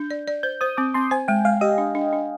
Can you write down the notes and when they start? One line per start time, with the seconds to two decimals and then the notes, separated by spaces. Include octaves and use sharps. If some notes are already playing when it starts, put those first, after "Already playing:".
Already playing: D4 G6
0.11 D5
0.28 D5
0.43 C5 G6
0.61 C5 D#6
0.77 C4 D6
0.94 C4 C6
1.11 C5 G#5
1.28 G#3 G5
1.45 G#3 F5
1.61 G4 D#5
1.78 D4
1.95 D4
2.13 D4